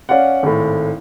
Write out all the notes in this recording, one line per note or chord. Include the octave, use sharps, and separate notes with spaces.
C#4 D5 F5 F#5
G#1 A2